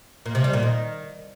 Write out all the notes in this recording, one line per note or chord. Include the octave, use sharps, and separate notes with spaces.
A#2
C3
G3
A#2
D#3